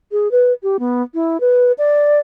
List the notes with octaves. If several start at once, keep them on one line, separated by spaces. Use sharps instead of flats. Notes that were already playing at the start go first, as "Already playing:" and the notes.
G#4
B4
G4
B3
E4
B4
D5